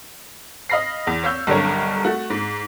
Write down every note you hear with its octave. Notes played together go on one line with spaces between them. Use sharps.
D#5 F5 B5 A#6 C7
E2
C#5 F5 E6 G6
B1 G2 D3 G3 A#4 C#5
A3 F#4
G#2